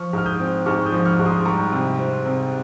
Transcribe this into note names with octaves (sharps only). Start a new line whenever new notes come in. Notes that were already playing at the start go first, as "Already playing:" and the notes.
Already playing: F3 C#6 F6
G#2 F6
D#6 G6
C4
G#2 C#6 F6
D#6 G6
F3
C#6 F6
G#2
C6 D#6
G3 A#5 C#6
C3
C4
C3